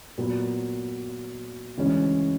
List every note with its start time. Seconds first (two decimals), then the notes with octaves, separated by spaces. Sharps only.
0.18 A#2 F#3 B3
1.78 D2 C#3 E3 G#3 C#4